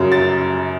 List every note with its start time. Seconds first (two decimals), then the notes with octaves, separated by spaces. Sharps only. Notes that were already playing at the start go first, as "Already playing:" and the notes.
Already playing: F#2 C#3 F#3
0.12 A6